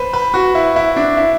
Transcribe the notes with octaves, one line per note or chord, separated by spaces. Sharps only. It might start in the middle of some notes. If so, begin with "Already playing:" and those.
Already playing: B4 C5
B4
F#4
E4
E4
D4
E4